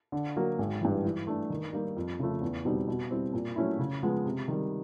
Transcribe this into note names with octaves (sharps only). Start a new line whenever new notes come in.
D3
F#3 A#3
G#1
G2 E3
E3
A3 D4
D#3
G3 A#3 D#4 G4
F2
C#3 F3 A3
E2
B2 G3 C4 D#4
B2
G3 C4 E4
A#2
F#3 A3 C#4 E4
C#3
F3 G#3 B3
C3
D#3 G3